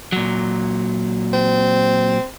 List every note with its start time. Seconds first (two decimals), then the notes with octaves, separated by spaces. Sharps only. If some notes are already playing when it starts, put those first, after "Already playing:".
0.12 A#2 F#3
1.33 C4